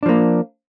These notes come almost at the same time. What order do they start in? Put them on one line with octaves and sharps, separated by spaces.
D4 F3 A#3